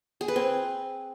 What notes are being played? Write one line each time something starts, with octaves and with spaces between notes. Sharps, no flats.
G#4
B4
C4